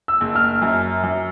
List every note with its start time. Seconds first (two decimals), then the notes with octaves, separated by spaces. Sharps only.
0.08 E6
0.21 F#1
0.35 F6
0.62 F#2
1.03 F#2